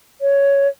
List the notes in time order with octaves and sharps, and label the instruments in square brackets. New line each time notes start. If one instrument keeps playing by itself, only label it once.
[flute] C#5